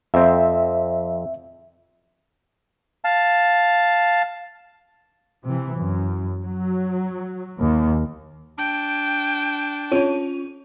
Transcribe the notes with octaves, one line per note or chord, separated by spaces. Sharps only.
F2 C4 E5
F5 A5
C3 E3
F#2
F#3
D#2
D4 G5
C#4 F4 C#5 D#7